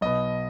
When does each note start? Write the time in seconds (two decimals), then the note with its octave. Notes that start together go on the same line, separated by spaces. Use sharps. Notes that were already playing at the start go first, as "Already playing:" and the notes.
0.01 B1 B2 D#5